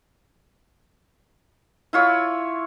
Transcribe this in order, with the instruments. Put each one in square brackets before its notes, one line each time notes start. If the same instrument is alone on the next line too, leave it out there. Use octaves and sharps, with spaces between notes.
[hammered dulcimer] E4 F4 C#5